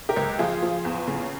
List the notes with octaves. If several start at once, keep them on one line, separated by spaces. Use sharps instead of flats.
G4 A#4
C#2
F3 F4 G#4
F3
E2
C#3